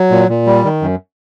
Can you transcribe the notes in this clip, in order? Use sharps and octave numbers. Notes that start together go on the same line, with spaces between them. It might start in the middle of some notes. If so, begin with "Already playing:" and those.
Already playing: F#3
A#2
A#2
G3
D#3
F#2